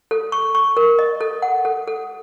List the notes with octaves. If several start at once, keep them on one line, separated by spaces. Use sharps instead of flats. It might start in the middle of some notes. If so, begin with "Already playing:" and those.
A4
C#6
C#6
A#4
D#5
A4
F#5
A4
A4